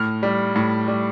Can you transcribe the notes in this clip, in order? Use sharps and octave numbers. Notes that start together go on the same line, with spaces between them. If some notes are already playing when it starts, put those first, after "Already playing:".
Already playing: A2 F6
G3
A2
G3